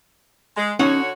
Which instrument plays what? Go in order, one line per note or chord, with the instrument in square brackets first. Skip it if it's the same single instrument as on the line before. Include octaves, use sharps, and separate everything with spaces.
[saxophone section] G#3
[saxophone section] D3 F#4 C#5 [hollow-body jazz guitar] C#4 D#4 F#5